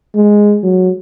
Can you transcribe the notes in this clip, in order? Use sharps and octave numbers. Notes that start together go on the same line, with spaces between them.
G#3
F#3